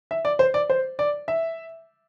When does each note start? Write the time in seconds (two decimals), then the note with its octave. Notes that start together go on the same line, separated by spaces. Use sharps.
0.11 E5
0.25 D5
0.39 C5
0.54 D5
0.70 C5
0.99 D5
1.28 E5